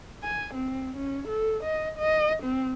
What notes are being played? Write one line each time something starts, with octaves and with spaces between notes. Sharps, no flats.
G#5
C4
C#4
A4
D#5
D#5
C4